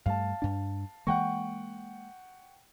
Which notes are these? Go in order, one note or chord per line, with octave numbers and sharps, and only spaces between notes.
G2 G3 A3 F5 A5
G2 D4
E3 G#3 A#3 F#5 G5 C#6